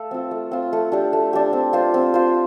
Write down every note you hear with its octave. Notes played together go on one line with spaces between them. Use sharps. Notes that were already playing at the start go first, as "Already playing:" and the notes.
Already playing: A3 A4 F5
C4 F4
A3
C4 F4
A3
D4 G4
A3
D4 G4
C4
F4 C5
C4
F4 C5